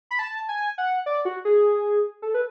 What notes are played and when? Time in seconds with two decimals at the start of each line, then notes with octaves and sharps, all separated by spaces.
0.11 B5
0.19 A5
0.49 G#5
0.78 F#5
1.06 D5
1.25 F#4
1.45 G#4
2.22 A4
2.34 B4